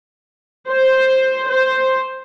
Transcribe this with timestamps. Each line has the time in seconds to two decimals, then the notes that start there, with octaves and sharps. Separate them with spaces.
0.69 C5
1.49 C5